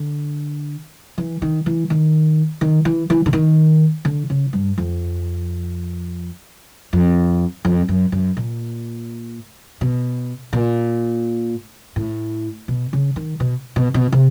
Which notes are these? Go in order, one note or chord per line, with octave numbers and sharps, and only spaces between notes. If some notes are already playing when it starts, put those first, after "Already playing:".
Already playing: D3
E3
D#3
E3
D#3
D#3
E3
E3
D3
D#3
D3
C#3
G2
F2
F2
F2
F#2
F#2
A#2
B2
A#2
A2
B2
C#3
D#3
B2
B2
B2
C3